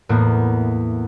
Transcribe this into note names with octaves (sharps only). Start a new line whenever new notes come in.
E2 A2 A#3 B3